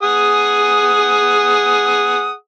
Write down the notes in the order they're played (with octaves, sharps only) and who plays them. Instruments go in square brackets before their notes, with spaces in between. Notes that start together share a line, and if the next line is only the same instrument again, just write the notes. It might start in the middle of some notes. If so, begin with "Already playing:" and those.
[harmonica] G#4 F#5 D#6